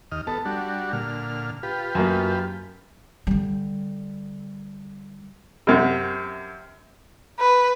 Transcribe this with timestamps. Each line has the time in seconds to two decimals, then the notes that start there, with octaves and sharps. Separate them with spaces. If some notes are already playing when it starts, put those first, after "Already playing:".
0.12 D#2 D#5 F6
0.27 B3 A4 A5
0.45 G3 D4 F#4
0.93 A#2 D3 F6
1.63 F4 G4 B4
1.95 F#2 F#3 A#3
3.27 D3 G3
5.67 F#2 C3
7.39 B4